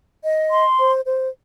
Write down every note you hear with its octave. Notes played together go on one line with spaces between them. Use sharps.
D#5
C6
C5
C5